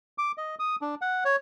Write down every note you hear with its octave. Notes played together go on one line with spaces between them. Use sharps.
D6
D#5
D#6
D4
F#5
C#5